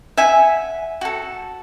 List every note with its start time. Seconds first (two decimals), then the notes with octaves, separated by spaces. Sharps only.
0.17 E5 F#5 G#5
1.01 F#4 A4